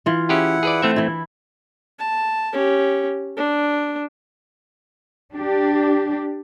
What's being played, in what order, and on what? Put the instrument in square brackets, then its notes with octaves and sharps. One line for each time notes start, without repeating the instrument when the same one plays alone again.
[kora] E3 F4
[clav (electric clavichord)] C#4 G4 G#4 [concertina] E4 F#5
[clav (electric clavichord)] G#4 B4 D5
A3 C4 E5
[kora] E3 E4
[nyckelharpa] A5
C#4 G4
D4
[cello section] D4 G4